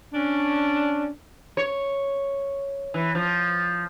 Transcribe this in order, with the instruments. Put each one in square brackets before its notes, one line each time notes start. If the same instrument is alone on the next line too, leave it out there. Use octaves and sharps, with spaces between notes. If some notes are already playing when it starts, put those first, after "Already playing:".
[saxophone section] C#4 D4
[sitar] C#5
E3
F3